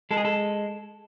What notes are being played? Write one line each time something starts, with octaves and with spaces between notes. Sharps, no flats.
G#3 A4
G#4
A4